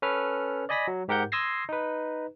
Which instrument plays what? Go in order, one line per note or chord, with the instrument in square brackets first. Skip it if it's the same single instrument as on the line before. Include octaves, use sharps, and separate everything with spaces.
[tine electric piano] C#4 A4 B4 F6
D5 D#5 G#5 B5 A#6 B6
F#3
G#2 G4 A#4 F#5 G6
C6 D#6 E6 G#6 A#6 C7
D#4 B4